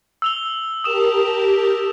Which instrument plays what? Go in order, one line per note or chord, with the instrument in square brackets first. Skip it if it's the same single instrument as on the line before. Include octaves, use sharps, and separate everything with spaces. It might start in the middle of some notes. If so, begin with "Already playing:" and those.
[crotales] E6 F7 G7
[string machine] G4 A#4 A5 [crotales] D#6 E7